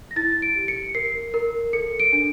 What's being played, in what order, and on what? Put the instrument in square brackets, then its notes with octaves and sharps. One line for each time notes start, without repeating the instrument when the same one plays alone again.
[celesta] A#6
E4 A6
D7
G4
C#7
A#4 C7
A#4
A4 C#7
D7
D4